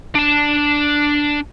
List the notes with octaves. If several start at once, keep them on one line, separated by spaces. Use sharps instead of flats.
D4 A5